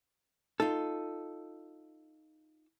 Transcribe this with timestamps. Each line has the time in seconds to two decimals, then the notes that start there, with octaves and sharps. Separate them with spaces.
0.60 D#4 F4 A4